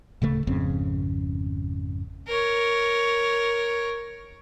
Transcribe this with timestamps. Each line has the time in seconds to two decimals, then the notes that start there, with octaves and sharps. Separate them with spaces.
0.22 D1 C#3 A3
0.47 G#1 F2 C#3 C4
2.28 A#4 C#5